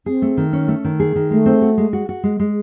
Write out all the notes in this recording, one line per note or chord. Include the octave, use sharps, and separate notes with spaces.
C4 G#4
A3
D#3
C#4
A3
D#3
G#4
D#3
G#3 A3
C4
F#4
G#3
F#4
F#4
G#3
G#3